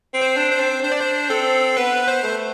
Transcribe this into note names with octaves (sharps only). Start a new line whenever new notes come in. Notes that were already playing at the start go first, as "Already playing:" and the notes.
C4
C5
D4
C5
C4
D4 C5
D5
C5
C4 A4
B3 B4
C5
A3